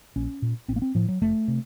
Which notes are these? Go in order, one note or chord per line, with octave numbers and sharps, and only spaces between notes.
A#1 C#4
A#2
A1 C4
A#3
C4
A2 F3
F#3
F1 A3
C3